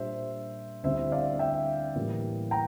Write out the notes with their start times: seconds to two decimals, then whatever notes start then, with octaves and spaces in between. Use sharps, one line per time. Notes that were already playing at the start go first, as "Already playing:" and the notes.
Already playing: A#2 G3 D4 C5 E5
0.83 D2 D3 G3 C4 E4 C5 E5
1.12 D5 F5
1.39 E5 G5
1.96 A2 E3 G3 A#3
2.51 G5 A#5